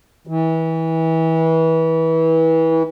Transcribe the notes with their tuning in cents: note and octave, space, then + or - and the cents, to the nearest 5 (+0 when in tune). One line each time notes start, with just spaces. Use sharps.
E3 -25